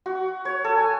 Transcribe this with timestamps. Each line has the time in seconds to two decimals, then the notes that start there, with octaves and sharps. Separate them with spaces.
0.06 F#4
0.45 C#5
0.64 A4
0.78 G#5